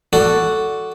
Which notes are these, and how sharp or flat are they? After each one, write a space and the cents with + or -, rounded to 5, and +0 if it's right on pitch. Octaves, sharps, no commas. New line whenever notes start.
F#4 +0 A4 +0 D5 +0